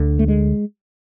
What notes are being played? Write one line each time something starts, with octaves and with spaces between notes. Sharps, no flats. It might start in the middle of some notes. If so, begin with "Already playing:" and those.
Already playing: D2 D3
A3
G#3